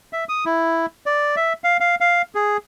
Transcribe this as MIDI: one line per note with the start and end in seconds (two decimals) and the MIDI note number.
0.13 0.24 76
0.29 0.45 87
0.45 0.86 64
1.06 1.35 74
1.36 1.53 76
1.64 1.77 77
1.80 1.95 77
2.00 2.22 77
2.35 2.57 68